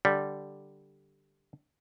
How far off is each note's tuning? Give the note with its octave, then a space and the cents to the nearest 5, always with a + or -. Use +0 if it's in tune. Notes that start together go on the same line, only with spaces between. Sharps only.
D3 +0 G3 -5